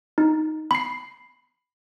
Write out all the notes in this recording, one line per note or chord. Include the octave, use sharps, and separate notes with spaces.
D#4
B5 C7